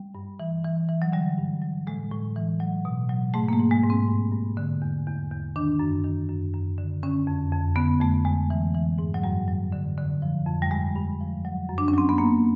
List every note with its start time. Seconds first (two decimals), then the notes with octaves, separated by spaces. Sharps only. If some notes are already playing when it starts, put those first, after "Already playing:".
Already playing: G3
0.15 G2
0.40 E3
0.65 E3
0.89 E3
1.02 F#3
1.13 D3 G3
1.37 G2
1.62 F#3
1.87 A2 G#3
2.12 A2
2.36 E3
2.60 F#3
2.85 B2
3.09 F#3
3.34 G#2 A3
3.48 A#3
3.53 A3
3.59 G#2
3.71 G#3
3.84 G#2
3.90 C4
4.08 G2
4.32 G2
4.57 D3
4.82 E2
5.07 E2
5.31 E2
5.56 D#3 D4
5.79 F#2
6.04 D#3
6.29 F#2
6.53 F#2
6.78 D3
7.03 D3 C#4
7.27 F2
7.52 F2
7.76 D3 B3
8.01 F2 A3
8.25 F2 G#3
8.50 E3
8.75 E3
8.98 G#2
9.14 F#3
9.24 F#2 G3
9.48 F#3
9.72 D3
9.98 D3
10.22 F3
10.46 F2
10.62 G3
10.71 G2 G#3
10.96 G2
11.21 F3
11.45 F#3
11.69 F#2
11.78 D4
11.88 C#4
11.94 F#3 C4
12.09 B3
12.18 G2 A#3